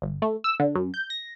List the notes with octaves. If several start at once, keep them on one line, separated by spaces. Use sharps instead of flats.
G1
A3
E6
D3
F#2
G6
A#6